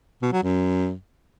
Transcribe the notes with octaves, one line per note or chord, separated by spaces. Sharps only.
B2
F#3
F#2